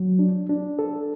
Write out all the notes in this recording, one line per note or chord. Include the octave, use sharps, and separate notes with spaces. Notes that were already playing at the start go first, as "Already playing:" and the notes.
Already playing: F#3
D4
D4
A4